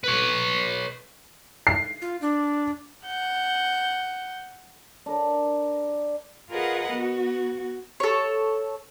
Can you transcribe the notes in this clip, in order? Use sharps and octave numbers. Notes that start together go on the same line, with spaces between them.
B4 C#5
C7
F4
D4
F#5 G6
D4 A#4
F4 G#4 A#4 B4 D#5 F#5
B3 F#4
A4 C#5